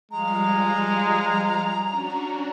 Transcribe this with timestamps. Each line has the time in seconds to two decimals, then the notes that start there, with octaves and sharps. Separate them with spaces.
0.11 F3 G3 G#3 F5 A#5
1.85 C#4 D4 F#4